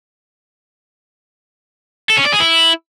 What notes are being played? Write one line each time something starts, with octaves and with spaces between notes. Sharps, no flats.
A4
C#4
D5
G#4
E4